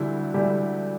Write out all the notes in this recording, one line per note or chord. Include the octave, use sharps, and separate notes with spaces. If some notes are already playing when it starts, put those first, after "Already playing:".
Already playing: D2 D3 G3 E4 G4
D2 D3 G3 E4 G4